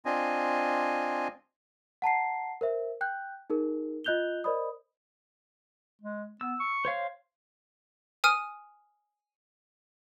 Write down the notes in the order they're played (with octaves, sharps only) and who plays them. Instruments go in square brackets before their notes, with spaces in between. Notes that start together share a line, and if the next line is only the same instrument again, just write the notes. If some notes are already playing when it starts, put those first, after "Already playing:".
[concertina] C4 D4 F4 D#5 G#5
[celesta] F#5 A5 A#5 C7
A#4 C5 E5
G5 F#6 G6
D#4 G#4 A#4
F4 D#5 F#6 G6 F7 G7
A#4 C5 D5 D#5 B5 D#6
[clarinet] G#3
[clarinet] B3 [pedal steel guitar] E6
[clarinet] C#6
[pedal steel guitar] C5 C#5 F5
[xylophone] G#5 D#6 F6 D#7